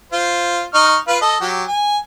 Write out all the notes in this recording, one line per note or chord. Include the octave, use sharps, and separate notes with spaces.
F4 C5
D#4 C#6 F6
F4 B4 F5
A4 D#5
F#3 G4
G#5